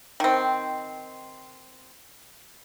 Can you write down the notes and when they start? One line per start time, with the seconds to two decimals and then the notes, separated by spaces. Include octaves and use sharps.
0.20 D#3 C4